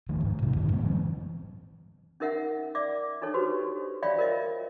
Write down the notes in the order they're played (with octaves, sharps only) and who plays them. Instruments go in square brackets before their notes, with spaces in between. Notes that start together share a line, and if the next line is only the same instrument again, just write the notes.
[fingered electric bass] E1 D#3 F3 A3
G#2
D2 C3 D#3
G2 D3 D#3
A2 C#3 G#3 B3
E3 F#3 A3 C4
[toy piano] C#4 D#4 A#4 E5 F#5
D5 E5 D6
D4 D#4 A4 C#5
F#4 G4 B4 C5
C#5 D5 E5 F5 G5 B5
F4 A#4 C5 D#5 E5